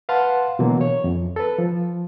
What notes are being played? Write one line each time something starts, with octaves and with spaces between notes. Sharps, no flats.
B4 F5 F#5 A5 C6
B2 D3 E3 F#3 A#3
C#5
F2
A4 B4
F3